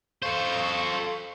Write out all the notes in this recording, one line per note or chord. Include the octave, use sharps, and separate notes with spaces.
A4 C5 F5 C#6